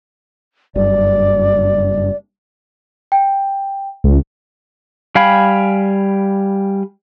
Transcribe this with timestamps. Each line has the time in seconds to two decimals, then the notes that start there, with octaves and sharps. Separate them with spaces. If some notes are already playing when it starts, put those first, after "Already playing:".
0.75 F#1 G2 D5
3.12 G5
4.04 C#2
5.15 G3 F5 G5 G#5 B5